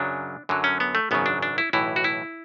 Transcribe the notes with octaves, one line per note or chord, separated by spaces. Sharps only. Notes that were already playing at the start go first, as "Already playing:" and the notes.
Already playing: F#2 C#3 F#3 D4
F#2 D3 F#3
C#4
B3
A3
G#1 F#2 C#3 F#3 B3
D4
D4
E4
B1 A2 E3 E4
F#4
E4